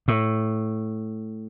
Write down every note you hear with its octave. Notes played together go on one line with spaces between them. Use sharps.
A2